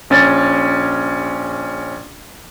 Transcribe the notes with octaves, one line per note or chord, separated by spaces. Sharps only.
A#1 C#4 A6